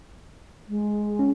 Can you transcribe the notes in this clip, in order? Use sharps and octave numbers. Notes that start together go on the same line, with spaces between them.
G#3
C#4